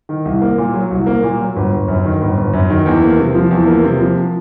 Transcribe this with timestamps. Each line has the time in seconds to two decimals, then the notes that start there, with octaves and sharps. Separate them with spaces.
0.09 D#3
0.25 C2
0.41 A#3
0.58 A#2
0.74 F#3
0.91 C2
1.06 A#3
1.23 A#2
1.40 F#3
1.56 G1
1.72 G1
1.88 F#2
2.05 D#3
2.21 G1
2.37 G1
2.53 F#2
2.70 D#3
2.86 E2
3.02 A#3
3.19 C3
3.35 F3
3.51 E2
3.67 A#3
3.84 C3
4.00 F3